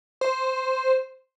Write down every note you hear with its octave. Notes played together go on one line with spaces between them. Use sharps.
C5